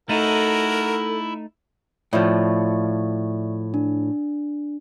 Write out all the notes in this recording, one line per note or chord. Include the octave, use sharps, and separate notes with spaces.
A3 D#4 E4 F#4 A4 A#4
A2 F3 D5 E5 C#6
D4